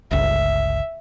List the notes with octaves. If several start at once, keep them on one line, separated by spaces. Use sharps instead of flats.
G1 C#2 E5